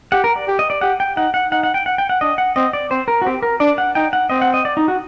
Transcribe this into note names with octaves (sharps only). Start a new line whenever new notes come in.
G4 F#5
A#4
D5
G4
D#5
D5
G4 F#5
G5
D#4 F#5
F#5
D#4 F#5
F#5
G5
F#5
G5
F#5
D4 D#5
F#5
C4 D#5
D5
C4 C5
A#4
F#4
C4 G4
A#4
D4 D5
F#5
D#4 G5
F#5
C4 D#5
F#5
D#5
D5
D#4
F#4